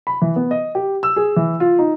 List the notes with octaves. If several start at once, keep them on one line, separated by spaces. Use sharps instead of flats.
B5
E3
B3
D#5
G4
E6
G#4
E3
F4
D#4